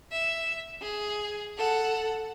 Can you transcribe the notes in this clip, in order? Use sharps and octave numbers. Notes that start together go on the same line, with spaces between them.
E5
G#4
A4 F#5